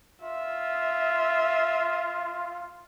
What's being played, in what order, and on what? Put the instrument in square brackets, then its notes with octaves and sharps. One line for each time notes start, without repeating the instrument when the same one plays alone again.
[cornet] F4 [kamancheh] E5